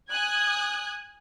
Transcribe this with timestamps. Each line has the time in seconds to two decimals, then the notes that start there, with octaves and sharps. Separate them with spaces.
0.10 G#5 D#6 F#6 G#6